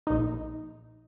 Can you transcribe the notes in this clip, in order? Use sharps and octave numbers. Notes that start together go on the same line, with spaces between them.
A#1 D#4